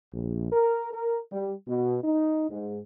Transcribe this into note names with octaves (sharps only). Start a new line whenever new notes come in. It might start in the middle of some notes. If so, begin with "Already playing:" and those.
A#1
A#4
A#4
G3
B2
D#4
G#2